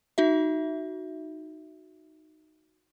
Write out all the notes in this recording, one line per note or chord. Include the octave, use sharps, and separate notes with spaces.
D#4 F#4 E5